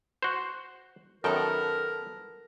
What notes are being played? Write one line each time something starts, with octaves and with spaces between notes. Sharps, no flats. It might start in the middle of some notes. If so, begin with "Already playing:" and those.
F#4 C5
F#2 D#3 B3 A4 A#4 G5